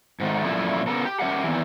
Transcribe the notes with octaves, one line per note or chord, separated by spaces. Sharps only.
G#2 D#3 A3
F#2 A#2 F3 A3 E4 F4
C#3 B3 A4 A#4
G4
C#4 G4 A#4 E5 F#5
E2 D#3 E3